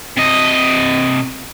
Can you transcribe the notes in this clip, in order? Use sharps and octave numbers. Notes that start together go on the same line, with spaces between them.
C3 D#5